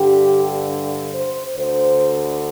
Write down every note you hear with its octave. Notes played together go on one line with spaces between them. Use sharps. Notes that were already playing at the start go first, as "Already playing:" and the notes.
Already playing: G2 D3 G4
C5
D2 D3 C5